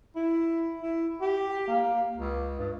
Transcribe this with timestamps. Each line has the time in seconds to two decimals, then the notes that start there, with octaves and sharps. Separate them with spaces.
0.16 E4
0.82 E4
1.21 G4
1.67 A#3
2.17 C#2
2.58 G2